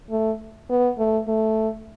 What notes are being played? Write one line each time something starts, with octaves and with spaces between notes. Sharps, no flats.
A3
B3
A3
A3